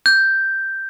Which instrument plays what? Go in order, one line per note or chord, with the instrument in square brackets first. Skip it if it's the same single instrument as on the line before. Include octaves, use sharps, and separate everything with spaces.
[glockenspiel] G6